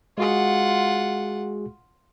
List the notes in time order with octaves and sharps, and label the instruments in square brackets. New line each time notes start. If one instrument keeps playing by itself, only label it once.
[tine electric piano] G#3 F#4 G#4 [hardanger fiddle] F4 F#5